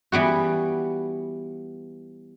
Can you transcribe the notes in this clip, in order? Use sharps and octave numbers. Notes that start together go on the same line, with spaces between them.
E3 G3 B3 F#4